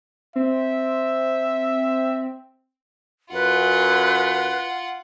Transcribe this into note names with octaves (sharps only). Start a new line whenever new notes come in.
C4 E5
F#2 F4 B4 F#5